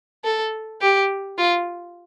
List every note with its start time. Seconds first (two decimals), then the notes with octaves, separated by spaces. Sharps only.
0.24 A4
0.81 G4
1.38 F4